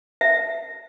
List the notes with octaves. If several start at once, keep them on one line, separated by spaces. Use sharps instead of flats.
E5